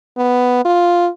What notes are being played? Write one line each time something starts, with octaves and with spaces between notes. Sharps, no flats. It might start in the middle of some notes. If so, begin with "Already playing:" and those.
B3
F4